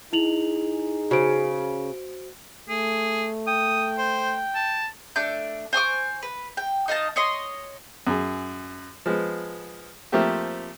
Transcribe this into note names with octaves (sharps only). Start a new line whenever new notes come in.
D#4 E4 G#4 F7 F#7
C#3 F#4 C5 D7
A3 G#4
G5 D#6
C5
A5
A3 D4 D6 G6
C5 G#5 C#6 D6
B4
G5
D#4 D#5 F5 A5
C#5 D#5 C6
F#2 G#4
F3 G#3 B3
F3 A3 A#3 C4 G4 E5